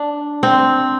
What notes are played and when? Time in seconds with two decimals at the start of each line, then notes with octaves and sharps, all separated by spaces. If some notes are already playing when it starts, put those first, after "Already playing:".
Already playing: D4
0.43 C4